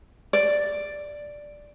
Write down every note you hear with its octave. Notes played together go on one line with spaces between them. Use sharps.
D5